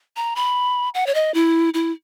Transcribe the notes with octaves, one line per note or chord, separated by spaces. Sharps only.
A#5
B5
F#5
C#5
D#5
E4
E4